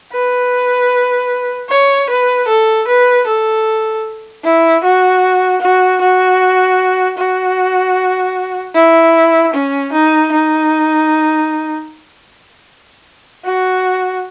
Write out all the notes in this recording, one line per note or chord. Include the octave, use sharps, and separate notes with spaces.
B4
C#5
B4
A4
B4
A4
E4
F#4
F#4
F#4
F#4
E4
C#4
D#4
D#4
F#4